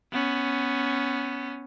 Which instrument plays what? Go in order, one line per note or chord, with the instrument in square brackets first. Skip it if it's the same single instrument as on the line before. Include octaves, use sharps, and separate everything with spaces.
[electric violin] B3 C#4